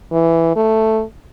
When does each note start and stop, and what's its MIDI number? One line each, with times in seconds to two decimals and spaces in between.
0.12 0.52 52
0.56 1.03 57